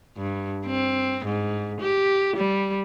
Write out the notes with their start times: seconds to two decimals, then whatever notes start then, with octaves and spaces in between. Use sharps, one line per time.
0.17 G2
0.66 C4
1.25 G#2
1.81 G4
2.36 G3